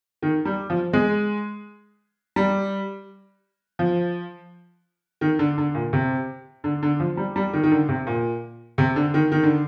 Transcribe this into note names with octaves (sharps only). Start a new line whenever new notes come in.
D#3
G3
F3
G#3
G3
F3
D#3
D3
D3
A#2
C3
D3
D3
F3
G3
G3
D#3
D#3
D3
C3
A#2
C3
D3
D#3
D#3
D3